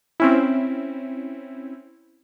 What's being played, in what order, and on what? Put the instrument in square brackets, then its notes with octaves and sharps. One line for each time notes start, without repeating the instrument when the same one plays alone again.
[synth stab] C4 C#4 E4